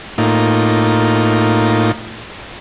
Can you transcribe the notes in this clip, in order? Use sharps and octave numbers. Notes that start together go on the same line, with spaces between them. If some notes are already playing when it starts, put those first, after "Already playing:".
A2 A#3 D#4 F4